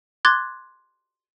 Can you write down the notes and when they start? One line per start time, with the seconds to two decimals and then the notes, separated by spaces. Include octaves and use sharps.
0.25 C6 D6 F#6 G#6 A6